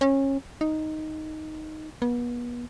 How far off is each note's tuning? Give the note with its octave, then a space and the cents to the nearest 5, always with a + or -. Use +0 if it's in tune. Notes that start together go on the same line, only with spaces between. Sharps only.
C#4 -25
D#4 +0
B3 -35